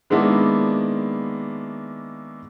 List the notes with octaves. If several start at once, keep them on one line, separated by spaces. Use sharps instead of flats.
D#3 G#3 A#3 B3 D4 E4